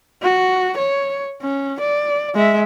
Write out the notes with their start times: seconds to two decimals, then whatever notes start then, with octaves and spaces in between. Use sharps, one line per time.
0.23 F#4
0.77 C#5
1.41 C#4
1.80 D5
2.35 G#3 E5